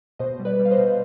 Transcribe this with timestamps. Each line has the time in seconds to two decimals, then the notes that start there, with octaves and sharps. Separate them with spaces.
0.19 B2 C5 D#5
0.39 G3
0.45 B4 D5
0.59 G3
0.65 F5
0.71 C5 D#5
0.78 B2